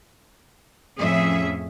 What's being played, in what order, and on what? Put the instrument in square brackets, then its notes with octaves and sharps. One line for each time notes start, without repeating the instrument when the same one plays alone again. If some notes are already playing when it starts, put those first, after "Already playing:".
[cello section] F2 A2 C#4 G#4 E5